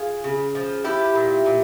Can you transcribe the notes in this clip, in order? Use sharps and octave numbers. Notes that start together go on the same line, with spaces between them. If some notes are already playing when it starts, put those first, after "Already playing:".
Already playing: F4 G#4
C#3
F3
F3 E4 G4
A#2
A#2